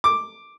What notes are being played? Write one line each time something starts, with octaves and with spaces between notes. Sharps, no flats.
D6